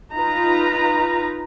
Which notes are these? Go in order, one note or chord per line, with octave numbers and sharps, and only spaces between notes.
D#4 F4 B4 A#5